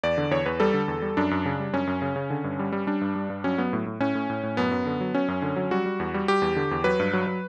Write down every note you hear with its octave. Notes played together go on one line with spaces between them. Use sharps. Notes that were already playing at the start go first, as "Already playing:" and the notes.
E2 D5
D3
E2 C#5
E2 B4
G3 A4
D3
E2
G3
F#2 D4
F#2
C#3
G3
F#2 C#4
F#2
C#3
C#3
D3
G2
G3
G3
G3 D4
G2
G3
G2
F#3 C#4
F#3 B3
A2
A2
A2 C#4
A2
A2
A2
F#2 B3
F#2
D3
F#3
F#3 C#4
F#2
D3
F#3
G3 F#4
G3
E2
G3
G3 G4
E2
D3
E2
F#3 B4
G2
F#3
F#3